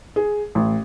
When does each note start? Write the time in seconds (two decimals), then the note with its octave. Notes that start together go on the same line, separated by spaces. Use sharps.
0.16 G#4
0.55 A1